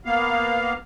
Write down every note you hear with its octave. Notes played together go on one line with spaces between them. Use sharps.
A#3 B3 F5